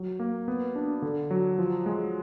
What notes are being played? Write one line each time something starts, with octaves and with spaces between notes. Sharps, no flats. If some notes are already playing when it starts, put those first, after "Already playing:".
Already playing: F#3
A#3
B3
D4
D3
F#3
F3
G#3